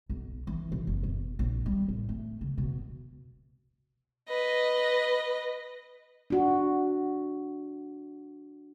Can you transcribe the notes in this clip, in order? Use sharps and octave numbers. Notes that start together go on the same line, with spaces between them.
B1
E3
B1
F#1
B2
A#1
G3
A2
A3
C#3
B2
B4 D#5
D4 F#4